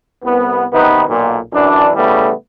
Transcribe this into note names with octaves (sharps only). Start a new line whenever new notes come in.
C2 B3
C3 D#3 B3 D#4 B4
B1 A#2
F#2 E3 D4
A2 C#3 G3 A3 B3